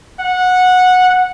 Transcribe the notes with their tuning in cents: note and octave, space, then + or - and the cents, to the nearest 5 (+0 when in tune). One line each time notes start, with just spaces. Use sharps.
F#5 -15